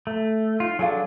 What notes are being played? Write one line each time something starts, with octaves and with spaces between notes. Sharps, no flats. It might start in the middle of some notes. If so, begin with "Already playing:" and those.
A3
D#4 F4
F#3 D4 G#4 A4 F5